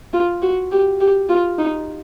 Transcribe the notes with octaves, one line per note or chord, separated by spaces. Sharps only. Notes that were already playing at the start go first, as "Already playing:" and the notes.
F4
F#4
G4
G4
F4
D#4